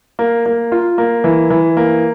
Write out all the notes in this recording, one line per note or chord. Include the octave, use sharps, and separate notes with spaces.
A#3
A#3
F4
A#3
E3
E3
A#3